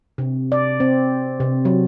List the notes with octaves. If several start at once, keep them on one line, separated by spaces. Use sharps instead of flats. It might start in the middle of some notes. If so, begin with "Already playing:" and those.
C3
D5
C4
C3
F#3